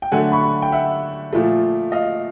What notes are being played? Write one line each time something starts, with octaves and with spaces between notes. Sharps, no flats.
G5
D3 F#3 A3 F#5 G#5
B5 C#6
G5
E5 F#5
A#2 F3 A3
D#5 F5